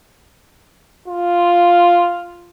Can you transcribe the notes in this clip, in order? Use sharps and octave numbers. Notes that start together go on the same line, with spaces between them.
F4